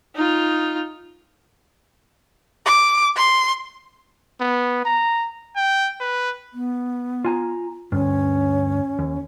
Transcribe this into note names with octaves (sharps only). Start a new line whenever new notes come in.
D#4 F4
D6
C6
B3
A#5
G5
B4
B3
F4 G#5 A#5
D2 G2 C#4
D#2